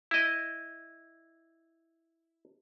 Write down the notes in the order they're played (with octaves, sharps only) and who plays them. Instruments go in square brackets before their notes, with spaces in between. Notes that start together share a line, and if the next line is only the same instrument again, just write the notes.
[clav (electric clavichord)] E4 D#5